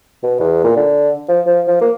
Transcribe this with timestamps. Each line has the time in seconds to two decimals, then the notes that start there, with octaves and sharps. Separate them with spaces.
0.23 B2
0.40 E2
0.64 A#2
0.76 D3
1.28 F3
1.46 F3
1.67 F3
1.81 A#3